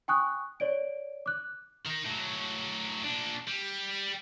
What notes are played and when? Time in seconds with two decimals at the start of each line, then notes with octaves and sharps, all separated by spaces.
0.08 G5 G#5 C#6 D#6 F#6
0.60 C#5 D5 D7
1.26 D6 F#6
1.86 D#3 D#4
2.05 A2 F#3
3.04 A#2 D4
3.48 G3